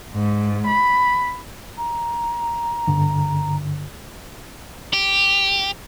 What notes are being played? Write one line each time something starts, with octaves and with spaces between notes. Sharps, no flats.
G#2
B5
A#5
G2 D3
G4